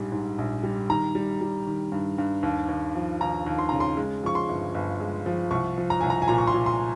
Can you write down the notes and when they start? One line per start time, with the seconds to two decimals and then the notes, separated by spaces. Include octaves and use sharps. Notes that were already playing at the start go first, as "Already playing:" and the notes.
Already playing: A#1 G#2 G3
0.12 G#2
0.38 A#1
0.63 G3
0.89 D#3 A#5
1.15 G3
1.41 G3
1.67 D#3
1.92 G2
2.18 G2
2.43 D#2
2.69 D#2
2.95 F3
3.21 D#2 A#5
3.46 D#2
3.59 C6
3.69 C#3 A#5
3.80 C6
3.97 G#3
4.23 F3 C#6
4.35 C6
4.49 G1
4.74 G1
5.00 G#3
5.26 F3
5.51 C2 C#6
5.78 F3
5.90 A#5
6.01 C2 G#5
6.10 A#5
6.22 G#5
6.28 A#2 A#5
6.38 C#6
6.47 C6
6.54 A#2
6.66 C6